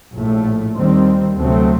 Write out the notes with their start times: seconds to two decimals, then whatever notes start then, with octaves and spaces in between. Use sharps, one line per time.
0.15 A#1 A2 A3
0.76 D#2 D#3 G3 C4
1.37 D2 C3 F#3 A3 C4